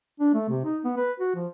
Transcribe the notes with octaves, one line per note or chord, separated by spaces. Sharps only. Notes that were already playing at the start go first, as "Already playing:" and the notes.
D4
A3
C3
D#4
B3
B4
F#4
F3